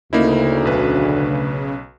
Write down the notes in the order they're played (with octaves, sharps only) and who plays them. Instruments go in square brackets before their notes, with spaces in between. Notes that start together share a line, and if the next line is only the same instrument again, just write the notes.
[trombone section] D2 [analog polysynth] C#3 [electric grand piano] A#3 D#4 E4
[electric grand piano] B1 B4